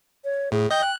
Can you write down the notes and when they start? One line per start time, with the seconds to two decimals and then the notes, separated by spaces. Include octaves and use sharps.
0.25 C#5
0.52 A2 G#4
0.71 D#5 G5 G6
0.83 F#6